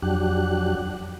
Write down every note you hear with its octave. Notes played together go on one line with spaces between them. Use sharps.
F2 F#3 D4 G4 F#6